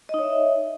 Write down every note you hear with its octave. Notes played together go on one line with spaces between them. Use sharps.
D#4 C#5 D#5 E5